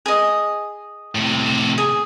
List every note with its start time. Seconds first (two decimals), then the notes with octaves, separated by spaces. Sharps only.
0.06 G#4 D#5
1.15 A2 C3
1.78 G#4